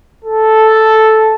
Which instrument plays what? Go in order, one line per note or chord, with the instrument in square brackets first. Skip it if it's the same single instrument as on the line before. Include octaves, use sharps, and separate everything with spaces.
[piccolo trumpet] A4